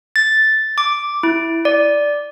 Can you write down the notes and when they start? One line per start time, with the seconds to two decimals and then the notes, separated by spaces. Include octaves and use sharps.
0.16 A6
0.78 D6
1.23 E4
1.65 D5